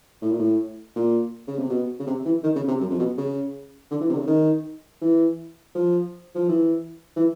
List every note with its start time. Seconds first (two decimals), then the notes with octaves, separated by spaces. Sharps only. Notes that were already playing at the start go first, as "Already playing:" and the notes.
0.22 A2
0.31 A#2
0.39 A2
0.96 A#2
1.48 C#3
1.59 C3
1.69 B2
2.00 C#3
2.07 C3
2.26 E3
2.44 D#3
2.56 C#3
2.68 C3
2.81 F#2
2.90 F2
2.99 B2
3.18 C#3
3.91 D3
4.01 E3
4.10 C3
4.15 D3
4.18 C#3
4.27 D#3
5.02 E3
5.75 F3
6.35 F3
6.49 E3
7.16 E3